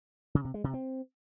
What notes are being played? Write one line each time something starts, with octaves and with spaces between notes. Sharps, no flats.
C#3
C3
G#3
C3
C4